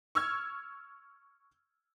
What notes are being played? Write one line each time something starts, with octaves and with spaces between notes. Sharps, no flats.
C#6 E6 F6 G#6